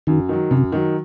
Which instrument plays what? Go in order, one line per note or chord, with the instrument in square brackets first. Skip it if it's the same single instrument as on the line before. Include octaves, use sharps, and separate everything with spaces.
[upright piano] F#2 [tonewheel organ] D#3
[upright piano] D#3 F#3
[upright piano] F#2 [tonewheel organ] C3
[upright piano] D#3 F#3